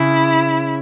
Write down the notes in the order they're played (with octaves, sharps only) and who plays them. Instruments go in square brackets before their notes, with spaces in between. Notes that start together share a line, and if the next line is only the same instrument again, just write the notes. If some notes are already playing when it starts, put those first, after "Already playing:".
Already playing: [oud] C#3 [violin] E4